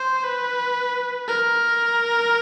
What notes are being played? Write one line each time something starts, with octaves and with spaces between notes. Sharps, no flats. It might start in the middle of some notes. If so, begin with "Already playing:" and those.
Already playing: C5
B4
A#4